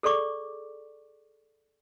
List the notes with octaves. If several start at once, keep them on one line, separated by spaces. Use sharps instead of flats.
G#4 A4 D5 C#6 D6